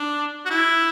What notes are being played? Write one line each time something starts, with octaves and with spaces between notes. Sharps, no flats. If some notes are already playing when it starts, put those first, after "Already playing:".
Already playing: D4
F#4
E4